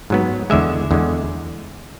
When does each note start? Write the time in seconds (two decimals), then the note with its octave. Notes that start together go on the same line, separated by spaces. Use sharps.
0.10 G#2 F#3 B3
0.50 E2 D3 G#3 E5
0.91 E2 D3 G#3